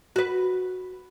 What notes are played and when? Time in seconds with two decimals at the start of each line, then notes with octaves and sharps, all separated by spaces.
0.16 F#4 B4